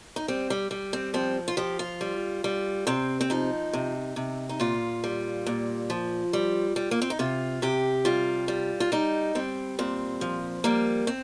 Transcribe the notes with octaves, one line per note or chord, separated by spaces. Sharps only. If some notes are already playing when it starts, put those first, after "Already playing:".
D#4
G3 C4
G3
G3
C4
F3 C4
F4
F3 G4
F4
G3
G3
C3 C4
C4
F3 D#4
C3
C3
D#4
A#2 F4
G3
A#2
F3
G3
G3
A#3
C4
D#4
C3 F4
C3 G4
G3 F4
G3
F4
G3 D#4
G3 C4
A#2 C4
F3
G3 A#3
C4